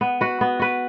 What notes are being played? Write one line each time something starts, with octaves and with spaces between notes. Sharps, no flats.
B3
F#4 B4
B3
F#4 B4